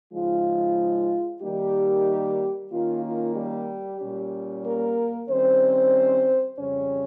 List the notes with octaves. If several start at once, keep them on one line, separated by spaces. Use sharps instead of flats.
C#3 F3 G#3 D#4 F4
D#3 G3 A#3 D#4 G4
D#3 A#3 C#4 F4
F4
G3 G4
A#2 G3 C#4
A#3 A#4
D#3 G3 C4 C#4 C5
F2 C#3 G3 C#4 C#5